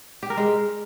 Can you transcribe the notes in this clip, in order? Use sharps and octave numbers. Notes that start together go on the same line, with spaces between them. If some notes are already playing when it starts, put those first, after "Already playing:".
G4
A#4
G#3